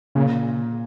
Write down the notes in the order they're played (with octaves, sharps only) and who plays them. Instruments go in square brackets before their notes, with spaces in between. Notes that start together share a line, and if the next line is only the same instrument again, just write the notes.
[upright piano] A#2 [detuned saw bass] C#3